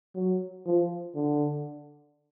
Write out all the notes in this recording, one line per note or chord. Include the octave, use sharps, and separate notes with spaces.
F#3
F3
D3